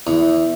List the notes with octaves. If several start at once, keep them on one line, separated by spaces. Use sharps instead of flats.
E2